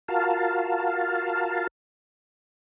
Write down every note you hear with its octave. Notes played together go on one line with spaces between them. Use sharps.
F4 F#4 A#4 F5 A5